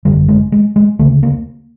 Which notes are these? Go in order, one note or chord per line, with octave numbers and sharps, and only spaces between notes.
G#1 F#2 D3 G3
G#3
G#3
G#3
D2 C#3 A3
A#3